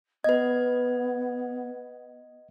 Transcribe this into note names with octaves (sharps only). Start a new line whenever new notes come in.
B3 B4 D#5 G#6